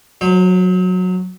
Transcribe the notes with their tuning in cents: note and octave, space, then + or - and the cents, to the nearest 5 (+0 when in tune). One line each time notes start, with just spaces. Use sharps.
F#3 -15 C5 +25